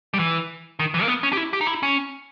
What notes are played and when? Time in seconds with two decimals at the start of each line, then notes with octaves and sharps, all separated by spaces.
0.14 G3
0.19 E3
0.79 D#3
0.94 E3
1.02 A#3
1.08 B3
1.23 C#4
1.33 G4
1.37 E4
1.53 G4
1.61 D#4
1.67 E4
1.83 C#4